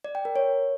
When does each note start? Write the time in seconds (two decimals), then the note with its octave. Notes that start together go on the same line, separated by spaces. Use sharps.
0.04 D5
0.15 G5
0.25 A#4
0.36 C#5